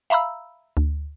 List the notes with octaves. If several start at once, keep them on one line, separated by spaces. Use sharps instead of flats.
E5 F5 A#5 B5 E6
D2